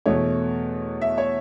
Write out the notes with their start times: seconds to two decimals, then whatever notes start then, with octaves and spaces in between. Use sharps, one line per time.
0.06 E2 B2 A3 C#5
1.01 E5
1.18 C#5